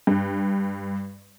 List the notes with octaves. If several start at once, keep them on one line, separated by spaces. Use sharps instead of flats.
G2